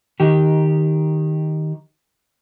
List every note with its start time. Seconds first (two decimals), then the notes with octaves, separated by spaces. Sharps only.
0.20 D#3 G4